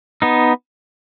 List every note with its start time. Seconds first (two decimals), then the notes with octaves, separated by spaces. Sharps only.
0.22 B3 D#4